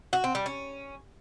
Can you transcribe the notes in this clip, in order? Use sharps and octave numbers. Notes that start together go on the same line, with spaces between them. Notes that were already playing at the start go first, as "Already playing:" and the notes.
F#4
C4
G3
C#4